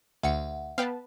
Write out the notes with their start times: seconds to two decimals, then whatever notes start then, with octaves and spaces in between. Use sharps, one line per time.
0.23 D2 E5 F#5 C#7
0.78 B3 B4 F5 G5 A5